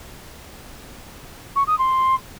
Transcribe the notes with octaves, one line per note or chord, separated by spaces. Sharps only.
C#6
D#6
C6